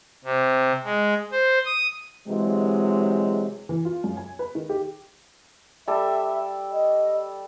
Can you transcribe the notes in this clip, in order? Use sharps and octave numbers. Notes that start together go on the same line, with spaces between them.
C3
G#3
C5
D#6
C3 E3 F#3 G#3
E3
F4
F#2
G#5
B4
D#3
G4
G3 A4 E5
D#5